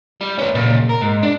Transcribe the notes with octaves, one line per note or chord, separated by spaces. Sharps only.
G3
C#4 B4
A#2 C#3
A#4
G#2
D4